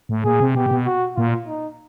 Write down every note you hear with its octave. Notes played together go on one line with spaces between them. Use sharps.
A2
A#2 G#4
C3
B2 G4
A#2
B2
F#4
A#2 F4
D#4